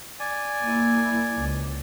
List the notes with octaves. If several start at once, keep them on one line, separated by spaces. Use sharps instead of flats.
D5 G#5
A#3 E4
C#2